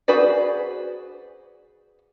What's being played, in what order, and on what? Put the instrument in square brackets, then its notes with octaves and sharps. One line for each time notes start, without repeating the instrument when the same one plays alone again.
[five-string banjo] F#4 G#4 B4 C5 D5